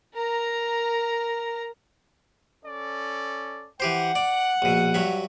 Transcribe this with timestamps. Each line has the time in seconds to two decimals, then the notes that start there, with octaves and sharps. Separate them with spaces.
0.14 A#4 A#5
2.65 C#4 A4 D5
3.80 E3 G4 C5 F#5
4.16 D5
4.62 A#1 B2
4.94 G2 F#3 E5